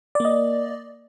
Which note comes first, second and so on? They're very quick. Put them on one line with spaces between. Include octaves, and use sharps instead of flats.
D5 A#3 D#5